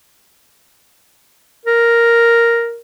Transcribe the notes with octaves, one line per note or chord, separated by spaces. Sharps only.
A#4